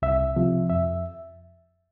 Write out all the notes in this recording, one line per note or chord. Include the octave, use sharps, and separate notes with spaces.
C2 E5
C3 F3
F2 E5